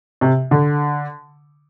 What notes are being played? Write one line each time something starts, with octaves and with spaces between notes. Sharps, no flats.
C3
D3